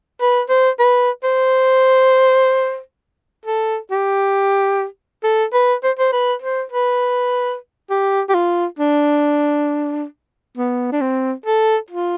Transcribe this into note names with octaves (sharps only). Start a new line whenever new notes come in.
B4
C5
B4
C5
A4
G4
A4
B4
C5
C5
B4
C5
B4
G4
G4
F4
D4
B3
D4
C4
A4
F4